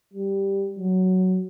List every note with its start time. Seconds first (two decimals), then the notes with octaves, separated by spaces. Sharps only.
0.13 G3
0.79 F#3